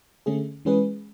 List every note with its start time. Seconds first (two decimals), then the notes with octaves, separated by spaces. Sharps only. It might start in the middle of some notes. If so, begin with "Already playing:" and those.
0.26 D3 A3 C#4 G#4
0.65 E3 G#3 C#4 G#4 B4